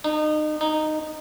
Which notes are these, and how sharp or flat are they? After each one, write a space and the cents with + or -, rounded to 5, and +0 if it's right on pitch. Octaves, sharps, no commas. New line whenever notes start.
D#4 -30
D#4 -10